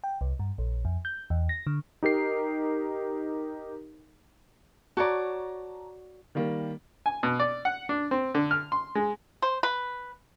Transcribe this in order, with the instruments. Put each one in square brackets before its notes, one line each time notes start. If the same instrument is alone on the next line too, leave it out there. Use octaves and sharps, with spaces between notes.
[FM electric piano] G5
C2
G2
A#1
F2
G6
E2
A#6
D3
[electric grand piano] D#4 G4 A#4 C7
[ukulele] F#4 C#5 D5 [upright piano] A5 A#5
[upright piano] D#3 G3 A#3
[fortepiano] G#5
B2
D5
F#5
D4
C4
D3
F6
C6
G#3
[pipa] C5
B4